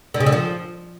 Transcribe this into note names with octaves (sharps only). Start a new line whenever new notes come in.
D3
C#3
D3
F3